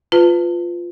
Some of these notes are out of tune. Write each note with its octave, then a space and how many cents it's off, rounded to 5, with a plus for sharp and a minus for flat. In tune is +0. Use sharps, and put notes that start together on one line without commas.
F4 +0 B4 +20 A5 +30